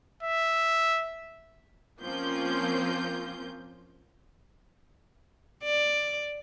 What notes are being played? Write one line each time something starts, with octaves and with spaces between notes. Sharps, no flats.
E5
F3 A#3 C4 C#4 F4 G6
D5